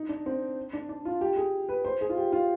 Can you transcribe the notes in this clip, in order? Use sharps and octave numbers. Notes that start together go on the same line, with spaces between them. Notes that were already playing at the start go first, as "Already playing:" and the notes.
Already playing: D#4
D4
C4
D4
D4
F4
G4
G#4
B4
C5
G#4
F4
G4
F4